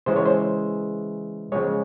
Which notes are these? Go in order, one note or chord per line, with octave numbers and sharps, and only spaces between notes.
C#3 E3 G#3 C5
C#5
C5
C#3 F3 G#3 C#5